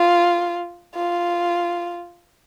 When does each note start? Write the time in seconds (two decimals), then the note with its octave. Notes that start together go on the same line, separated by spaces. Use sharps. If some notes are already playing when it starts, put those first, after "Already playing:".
Already playing: F4
0.95 F4